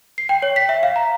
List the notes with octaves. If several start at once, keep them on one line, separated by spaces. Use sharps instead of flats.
C7
G5
C#5
B6
E5
F5
A#5